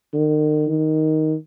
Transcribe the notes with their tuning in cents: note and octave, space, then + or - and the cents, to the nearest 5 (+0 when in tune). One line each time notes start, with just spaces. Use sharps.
D#3 -40
D#3 +5